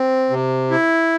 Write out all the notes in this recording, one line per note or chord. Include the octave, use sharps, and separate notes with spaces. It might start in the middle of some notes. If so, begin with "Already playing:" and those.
Already playing: C4
C3
E4